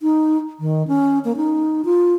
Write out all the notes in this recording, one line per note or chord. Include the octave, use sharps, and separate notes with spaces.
D#4
D#3
C#4
A#3
D#4
F4